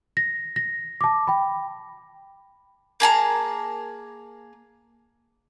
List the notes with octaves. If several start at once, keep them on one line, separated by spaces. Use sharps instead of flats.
A#6
A#6
A5 D6
G5 B5
A#3 G#4 A5 A#5